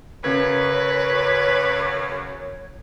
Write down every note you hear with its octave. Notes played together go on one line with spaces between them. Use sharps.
F#2 C#3 B4 C#5 G#6